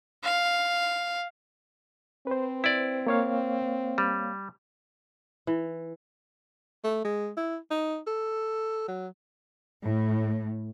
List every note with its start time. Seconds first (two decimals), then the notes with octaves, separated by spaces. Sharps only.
0.24 F5
2.27 C4 B4 C5
2.64 E4 D5
3.07 A#3 C#5 F5
3.98 G3
5.47 E3
6.84 A3
7.05 G#3
7.37 E4
7.70 D#4
8.07 A4
8.88 F#3
9.83 A2